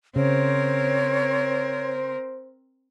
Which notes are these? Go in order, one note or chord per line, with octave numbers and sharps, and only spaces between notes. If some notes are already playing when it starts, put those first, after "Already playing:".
C#3 C4 A#4 C5 C#5